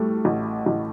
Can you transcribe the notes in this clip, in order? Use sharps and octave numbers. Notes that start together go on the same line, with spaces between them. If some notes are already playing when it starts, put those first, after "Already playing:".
Already playing: A2 G3 A3
A1
A1